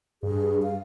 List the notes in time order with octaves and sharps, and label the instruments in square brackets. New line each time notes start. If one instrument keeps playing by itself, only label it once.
[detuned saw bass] G2 [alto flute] G#4
[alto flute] F5